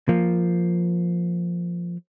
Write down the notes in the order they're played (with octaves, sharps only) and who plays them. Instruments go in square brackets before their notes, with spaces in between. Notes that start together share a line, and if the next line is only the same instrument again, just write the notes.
[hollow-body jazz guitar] F3 A#3